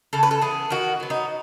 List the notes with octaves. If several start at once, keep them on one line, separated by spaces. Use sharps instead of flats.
C#3 A4
B4
A4
E3 B3 G#4
D#3 F#4
F#3 B3
D#4